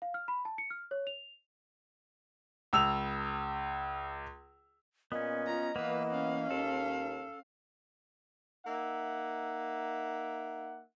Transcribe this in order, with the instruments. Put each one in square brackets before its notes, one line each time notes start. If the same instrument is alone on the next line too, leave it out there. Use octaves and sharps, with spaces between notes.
[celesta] F5
F6
B5
A5
C#7
F6
C#5
F7
[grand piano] C#2 E6 F7
[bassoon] A#2 [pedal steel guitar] B3 C#4 [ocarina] D#5
[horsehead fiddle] F4 A#5
[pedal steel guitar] E3 A#3 [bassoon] B3 [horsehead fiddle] B4 F5
[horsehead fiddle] C#4 F5
[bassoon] D#2 [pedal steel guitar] A4
[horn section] A#3 D#4 E5 F#5